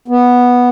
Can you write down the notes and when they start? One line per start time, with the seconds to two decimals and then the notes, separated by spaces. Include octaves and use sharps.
0.08 B3